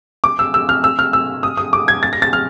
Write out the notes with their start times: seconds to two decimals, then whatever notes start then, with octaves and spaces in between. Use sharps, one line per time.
0.24 D6
0.39 E6
0.54 E6
0.69 F6
0.84 E6
0.99 F6
1.13 E6
1.43 D#6
1.57 D#6
1.73 D6
1.88 G#6
2.03 A6
2.13 A#6
2.22 A6
2.33 F6